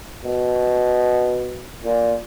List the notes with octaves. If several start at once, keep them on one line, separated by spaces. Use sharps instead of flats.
B2
A#2